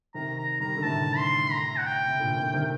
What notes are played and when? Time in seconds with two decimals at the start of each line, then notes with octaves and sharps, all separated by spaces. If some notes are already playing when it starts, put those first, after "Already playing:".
0.14 C3 D#3 A#5
0.38 A#5
0.60 D#3 G3 A#5
0.77 D3
0.83 A2 C3 A5
1.17 C6
1.52 A#5
1.78 F#5
1.86 G5
2.08 C3
2.19 A#2 D3
2.36 C3 D#3
2.54 C3 D#3